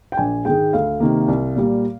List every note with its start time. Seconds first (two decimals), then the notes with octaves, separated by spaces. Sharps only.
0.12 G5
0.17 A#1 G#5
0.45 G#2 D#3 G#3 G5
0.73 D2 F5
1.00 C3 D#3 A#3
1.28 C2
1.56 A#2 G3 A#3